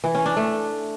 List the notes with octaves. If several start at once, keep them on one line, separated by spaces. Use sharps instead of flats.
E3
C#4
D4
A3